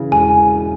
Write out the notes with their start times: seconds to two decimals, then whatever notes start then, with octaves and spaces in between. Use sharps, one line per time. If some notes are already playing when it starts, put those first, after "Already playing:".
Already playing: C#3 E3
0.11 E1 G#5